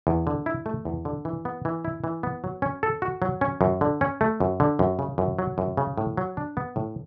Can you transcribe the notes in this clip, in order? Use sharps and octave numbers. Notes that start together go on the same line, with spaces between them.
E2
D3
E4
A3
E2
D3
E3
B3
E3
E4
E3
B3
F#3
C#4
A4
F#4
F#3
C#4
F#2
D3
C#4
A3
F#2
D3
F#2
C#3
F#2
F#3
F#2
C#3
A2
F#3
D4
B3
A2